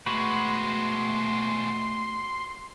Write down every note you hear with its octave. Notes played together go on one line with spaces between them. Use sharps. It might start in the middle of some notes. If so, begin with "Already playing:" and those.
B2 G#3 A3 F#4 B4 C6